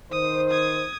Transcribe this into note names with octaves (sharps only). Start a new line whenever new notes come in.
D#3 C5 D#6
D#6 G#6